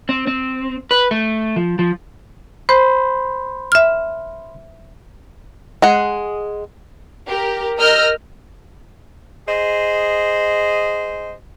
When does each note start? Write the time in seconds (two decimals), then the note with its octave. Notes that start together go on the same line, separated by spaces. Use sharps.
0.09 C4
0.27 C4
0.91 B4
1.11 A3
1.56 F3
1.79 F3
2.69 C5 B5 C6 G6
3.72 E5 F6
5.82 G#3 G#4 F#5
7.27 G4 A#4
7.78 A#4 D#5 E6 F6 G6 A#6
9.48 G#4 C5 D#5